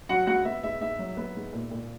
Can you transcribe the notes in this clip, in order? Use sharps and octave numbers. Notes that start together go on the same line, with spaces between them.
F#3 F#4 F#5
C#2 F#4 F#5
B3 E5
G#2 E5
G#2 E5
F#3
B3
G#2
A#2
A#2